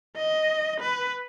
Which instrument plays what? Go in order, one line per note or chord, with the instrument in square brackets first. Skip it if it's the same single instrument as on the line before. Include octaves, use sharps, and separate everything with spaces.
[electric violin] D#5
B4